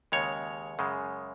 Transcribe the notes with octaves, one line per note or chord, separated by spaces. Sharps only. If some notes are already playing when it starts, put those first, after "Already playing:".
D#2 C#3 G#3 C#5
F#2 C#3 G#3